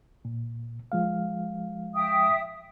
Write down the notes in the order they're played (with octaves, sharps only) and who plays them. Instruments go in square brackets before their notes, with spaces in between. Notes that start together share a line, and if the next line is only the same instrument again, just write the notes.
[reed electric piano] A#2
F3 G#3 F5
[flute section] E5 G5 D#6